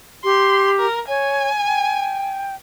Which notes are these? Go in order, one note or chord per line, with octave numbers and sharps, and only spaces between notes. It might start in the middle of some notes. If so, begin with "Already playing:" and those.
G4 C6
A#4
C#5 G#5
G5